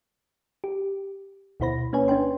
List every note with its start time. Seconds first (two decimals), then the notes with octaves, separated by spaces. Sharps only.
0.64 G4
1.60 D2 B2 E4 C5 B5 A#6
1.93 A#3 C#4 B4 C#5 G#5
2.08 C#4 D4 B4 G5 C6